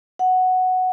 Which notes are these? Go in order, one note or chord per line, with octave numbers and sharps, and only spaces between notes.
F#5